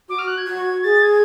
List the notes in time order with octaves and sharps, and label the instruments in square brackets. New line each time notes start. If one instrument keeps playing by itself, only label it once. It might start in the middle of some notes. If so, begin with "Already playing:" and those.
[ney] F#4 [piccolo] D6
[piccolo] F6
F#6
G#6
[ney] F#4
[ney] G#4 [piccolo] A6
[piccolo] G#6